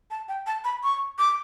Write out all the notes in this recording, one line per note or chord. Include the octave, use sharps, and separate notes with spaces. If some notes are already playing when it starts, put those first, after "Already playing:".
A5
G5
A5
B5
C#6
D6